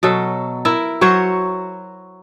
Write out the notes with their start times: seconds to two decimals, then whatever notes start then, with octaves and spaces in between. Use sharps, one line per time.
0.03 B2 F#3 A4
0.65 E4 A#4 E5
1.01 F#3 F#4 C5 C#5